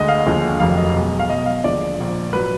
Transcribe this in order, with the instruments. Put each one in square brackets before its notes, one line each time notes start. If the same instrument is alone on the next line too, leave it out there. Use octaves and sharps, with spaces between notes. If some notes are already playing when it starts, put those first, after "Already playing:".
Already playing: [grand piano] D2 D3 G#3 D#5
F5
D#2 D3 F3 G#3
F1 F2 D#3 F#3 F5
D#5
B1 B2 G#3
F5
B1 B2 G#3 D#5
F5
D#2 D3 F3 G#3 D5
A#1 A#2 F3
G#1 F#3 B4